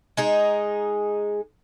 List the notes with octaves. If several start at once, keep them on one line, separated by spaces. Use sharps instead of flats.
G#3 D#4 G#4